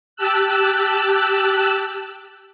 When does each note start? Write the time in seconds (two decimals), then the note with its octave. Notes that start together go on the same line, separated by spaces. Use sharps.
0.16 G4 A5 E6 F#6